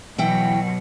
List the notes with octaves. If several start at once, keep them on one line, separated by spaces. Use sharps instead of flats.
B2 E3 F#3 E4 G5